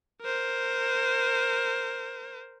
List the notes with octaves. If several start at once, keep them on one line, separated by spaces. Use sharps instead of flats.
A#4 C5